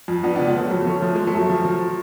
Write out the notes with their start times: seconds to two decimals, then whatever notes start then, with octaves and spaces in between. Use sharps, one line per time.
0.08 F2
0.23 F2 B3 D4
0.35 B3 D4
0.40 C#3
0.47 G#3 B3
0.55 F3 F#3 A3
0.71 F2 F#3 A3
0.86 F3 A3 C#4
1.02 F3 A3
1.15 F3 G#3
1.27 F#3 A3
1.33 F#2
1.49 F3
1.65 F3